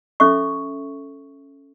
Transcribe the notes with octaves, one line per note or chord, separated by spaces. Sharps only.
C#4 A4 E5 C#6